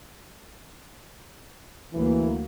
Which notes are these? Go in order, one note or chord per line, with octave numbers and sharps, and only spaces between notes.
D2 E3 F#3 A#3